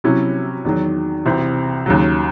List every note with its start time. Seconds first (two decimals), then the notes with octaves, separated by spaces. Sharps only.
0.04 C3 F#3 C#4 E4
0.65 E2 D#3 F#3
1.25 C2 C3 E3 C4
1.86 D#2 C#3 F#3